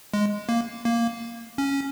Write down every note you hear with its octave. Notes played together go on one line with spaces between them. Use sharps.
G#3
A#3
A#3
C#4